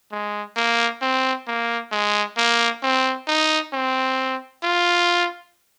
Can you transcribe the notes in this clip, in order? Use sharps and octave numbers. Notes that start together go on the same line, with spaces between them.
G#3
A#3
C4
A#3
G#3
A#3
C4
D#4
C4
F4